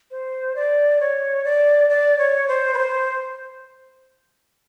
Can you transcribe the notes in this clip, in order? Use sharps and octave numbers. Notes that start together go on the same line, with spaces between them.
C5
D5
C#5
D5
D5
C#5
C5
B4
C5